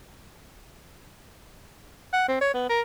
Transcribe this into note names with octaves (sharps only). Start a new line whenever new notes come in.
F#5
C4
C#5
B3
A#4